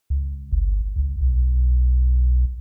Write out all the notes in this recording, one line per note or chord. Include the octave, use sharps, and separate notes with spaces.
C#2
G1
C#2
B1